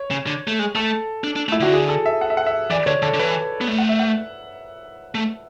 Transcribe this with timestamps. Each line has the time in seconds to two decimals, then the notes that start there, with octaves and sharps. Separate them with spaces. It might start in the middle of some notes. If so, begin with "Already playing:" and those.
Already playing: C#5
0.11 C#3
0.27 D3
0.47 A3
0.59 G#3
0.75 A3 A4
1.24 D4
1.36 D4
1.49 A3
1.52 E4
1.60 D3 F#4
1.73 G#4
1.89 A4
2.06 E5
2.21 F#5
2.30 E5
2.37 F#5
2.46 E5
2.70 E3 D5
2.86 D3 C#5
3.02 D3 A4
3.14 D3
3.19 E3 B4
3.61 B3
3.68 A3
3.78 F#5
3.89 E5
3.99 F#5
5.15 A3